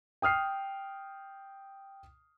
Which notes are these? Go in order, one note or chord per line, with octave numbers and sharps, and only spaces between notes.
G5 D#6 F6 C7